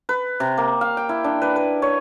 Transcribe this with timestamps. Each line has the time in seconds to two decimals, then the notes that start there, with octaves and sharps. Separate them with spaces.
0.09 B4
0.40 C3
0.58 A#3
0.81 F5
0.97 G5
1.09 E4
1.24 D4
1.42 B4
1.56 B4
1.82 C#5